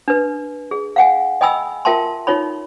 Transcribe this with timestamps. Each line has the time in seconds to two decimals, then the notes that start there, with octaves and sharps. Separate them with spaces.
0.08 D4 B4
0.71 G#4
0.96 F5 F#5 G#5
1.41 D#5 G5 G#5 B5 E6
1.85 F4 A#4 E5 G5 A5 C6
2.27 D#4 F4 C#5 B5